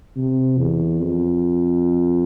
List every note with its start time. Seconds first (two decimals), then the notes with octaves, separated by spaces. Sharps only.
0.16 C3
0.59 E2
1.00 F2